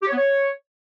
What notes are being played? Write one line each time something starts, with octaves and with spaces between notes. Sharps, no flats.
G4
C#5
B3
C#5